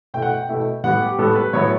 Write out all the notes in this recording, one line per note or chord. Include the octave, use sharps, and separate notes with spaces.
B2 A3 E4 G5
F#5
G5
B2 A3 E4
A2 G3 B3 F#5
G4
A2 G3 B3 A4
B4
A2 F#3 B3 E4 C#5